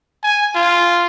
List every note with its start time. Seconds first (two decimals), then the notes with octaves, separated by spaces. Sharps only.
0.24 G#5
0.55 F4